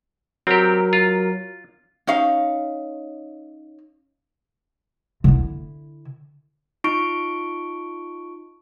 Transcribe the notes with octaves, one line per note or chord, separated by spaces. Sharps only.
F#3 C4 G4 A#4
F4
C#4 D#4 F5
D3 E4
D#4 F4 C#6 D7